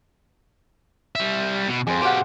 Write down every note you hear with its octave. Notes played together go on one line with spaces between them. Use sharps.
G3 E5
B2
F2 G#4 C5
B2 G4 C5 F5 F#5